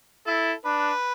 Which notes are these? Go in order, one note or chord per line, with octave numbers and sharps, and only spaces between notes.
E4 A4
D4 B4